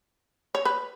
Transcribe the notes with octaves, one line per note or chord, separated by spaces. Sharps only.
C#5
B4